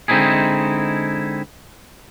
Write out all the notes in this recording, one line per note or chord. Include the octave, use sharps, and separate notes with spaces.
D3 G#3 C4 D#4 E4 G#4